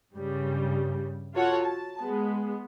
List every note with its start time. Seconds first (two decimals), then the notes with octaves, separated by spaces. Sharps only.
0.15 G2 C#3 G3
1.34 F4 F#4 A4 C#5 F#5
1.65 A5
2.02 G#3 B3